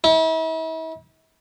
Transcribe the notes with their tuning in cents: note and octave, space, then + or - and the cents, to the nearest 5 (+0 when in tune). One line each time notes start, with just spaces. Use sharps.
E4 -40